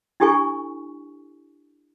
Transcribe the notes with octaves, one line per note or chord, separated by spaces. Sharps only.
D4 E4 G4 A4 G#5 C#6